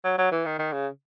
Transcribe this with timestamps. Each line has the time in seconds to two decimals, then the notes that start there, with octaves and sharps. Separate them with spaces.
0.04 F#3
0.18 F#3
0.32 E3
0.46 D#3
0.59 D#3
0.73 C#3